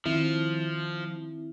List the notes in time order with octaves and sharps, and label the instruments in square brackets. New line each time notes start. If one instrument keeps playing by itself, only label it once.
[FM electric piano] D#3 C4 E4 [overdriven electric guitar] F3